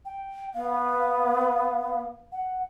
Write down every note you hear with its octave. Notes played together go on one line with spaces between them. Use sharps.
G5
B3 F5
F#5